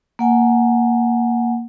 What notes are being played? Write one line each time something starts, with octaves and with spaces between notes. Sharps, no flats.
A#3 F#5 G#5